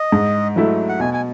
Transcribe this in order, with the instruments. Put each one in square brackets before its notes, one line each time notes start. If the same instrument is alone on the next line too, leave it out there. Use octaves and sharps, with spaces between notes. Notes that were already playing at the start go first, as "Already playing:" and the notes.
Already playing: [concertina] D#5
[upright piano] G#2
F#3 A3 E4
[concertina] F#5
[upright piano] B2 [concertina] G#5
[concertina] G#5